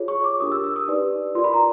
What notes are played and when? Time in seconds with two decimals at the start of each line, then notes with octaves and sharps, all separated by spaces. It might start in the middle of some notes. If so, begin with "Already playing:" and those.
Already playing: F4 G#4 C#5
0.08 C#6
0.24 D6
0.40 D4 G4 A#4 D#6
0.52 E6
0.64 E6
0.76 D#6
0.88 D#4 G4 B4 D5
1.35 F4 A#4 D5 C6
1.44 B5
1.53 A#5